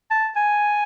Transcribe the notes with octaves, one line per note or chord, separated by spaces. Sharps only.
A5
G#5